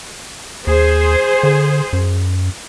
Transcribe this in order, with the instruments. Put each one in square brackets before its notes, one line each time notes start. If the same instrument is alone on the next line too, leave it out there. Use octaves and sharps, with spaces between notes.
[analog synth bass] D#2 [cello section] G#4 C5
[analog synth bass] D3
F#2